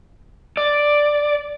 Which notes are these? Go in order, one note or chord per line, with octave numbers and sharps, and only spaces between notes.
D5